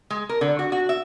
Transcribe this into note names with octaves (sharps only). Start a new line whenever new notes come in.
G#3
A#4
D3
F#4
F#4
E5